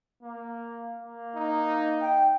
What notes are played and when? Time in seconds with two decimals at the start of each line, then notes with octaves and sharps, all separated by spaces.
0.23 A#3
1.00 A#3
1.35 D#4
2.01 G5